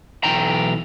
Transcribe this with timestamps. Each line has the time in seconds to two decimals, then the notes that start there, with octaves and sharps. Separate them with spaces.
0.24 B1 E3 G5 A#5